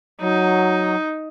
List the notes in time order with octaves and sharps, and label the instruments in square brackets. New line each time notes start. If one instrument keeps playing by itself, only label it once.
[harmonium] F#3 [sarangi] D#4